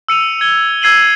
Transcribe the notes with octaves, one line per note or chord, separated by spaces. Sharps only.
E6 C#7 D#7 F7
G#6 G7
E6 G#6 C7 D#7 F#7